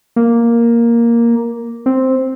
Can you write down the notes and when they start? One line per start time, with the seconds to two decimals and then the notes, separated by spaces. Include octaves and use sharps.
0.16 A#3
1.86 C4